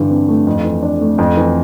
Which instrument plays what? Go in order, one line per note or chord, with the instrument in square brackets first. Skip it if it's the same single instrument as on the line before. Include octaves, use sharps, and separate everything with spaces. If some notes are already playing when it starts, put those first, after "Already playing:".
Already playing: [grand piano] G2 D3 E3
C4
A3
F2
E3
D4
A3
F2
E3